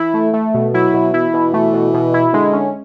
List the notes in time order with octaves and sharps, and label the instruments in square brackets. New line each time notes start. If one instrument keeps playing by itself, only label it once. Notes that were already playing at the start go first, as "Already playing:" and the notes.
Already playing: [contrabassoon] E3 [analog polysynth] E4
[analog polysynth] A3
A3
B2
[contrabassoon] F#3 [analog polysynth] E4
[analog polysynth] B2
[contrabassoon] E3 [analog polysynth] E4
[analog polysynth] B2
[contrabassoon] E3 [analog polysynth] A3
[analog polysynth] B2
B2
E4
[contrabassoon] D3 [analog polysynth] G#3
[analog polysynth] C#4